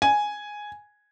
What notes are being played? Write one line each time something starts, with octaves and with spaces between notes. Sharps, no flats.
G#5